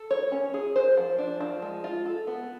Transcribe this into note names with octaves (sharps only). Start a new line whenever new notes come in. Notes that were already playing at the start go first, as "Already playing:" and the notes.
Already playing: A4
C#5
C#4
G#4
C5
F3
D4
F3
G#3
F4
A4
B3